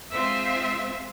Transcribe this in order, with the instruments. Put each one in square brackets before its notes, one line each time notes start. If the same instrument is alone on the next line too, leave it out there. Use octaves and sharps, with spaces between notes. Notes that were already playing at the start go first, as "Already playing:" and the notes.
[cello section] G#3 C4 F4 C5 E5